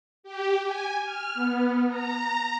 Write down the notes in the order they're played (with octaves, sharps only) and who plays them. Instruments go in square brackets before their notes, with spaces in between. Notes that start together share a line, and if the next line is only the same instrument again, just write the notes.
[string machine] G4
G#5
F6
B3
A#5